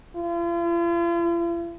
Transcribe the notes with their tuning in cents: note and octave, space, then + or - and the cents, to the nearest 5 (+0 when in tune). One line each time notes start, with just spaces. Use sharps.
F4 -45